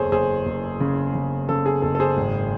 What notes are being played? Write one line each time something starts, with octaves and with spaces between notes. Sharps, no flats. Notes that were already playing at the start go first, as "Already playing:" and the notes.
Already playing: F#1 E2 G#4 A4 C5 C#5
F#1 G#4 C5
F#1
C#3
C#3
C#3 A4
G#4
F#1 A4
A4
G#4 C5
G#1